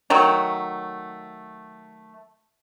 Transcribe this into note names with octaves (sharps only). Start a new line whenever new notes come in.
D#3 F#3 A3